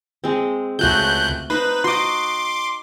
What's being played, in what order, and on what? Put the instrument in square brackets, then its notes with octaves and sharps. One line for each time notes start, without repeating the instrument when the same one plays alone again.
[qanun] G#3 C4
[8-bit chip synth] C#2 F#6 G6 [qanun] A3 F#4
[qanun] D#4 C5 [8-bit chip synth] B4
[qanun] F#4 D#5 [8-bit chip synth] C6 D6